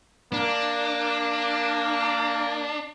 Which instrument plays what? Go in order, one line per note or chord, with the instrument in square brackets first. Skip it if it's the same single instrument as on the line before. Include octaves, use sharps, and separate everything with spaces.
[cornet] A#3 [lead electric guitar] D4